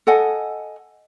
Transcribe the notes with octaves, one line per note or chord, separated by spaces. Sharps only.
A4 D#5 F#5 G#5